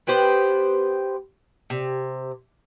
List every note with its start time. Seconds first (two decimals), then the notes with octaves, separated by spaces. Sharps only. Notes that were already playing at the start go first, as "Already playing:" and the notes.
0.07 B3 G4 B4 C5
1.70 C3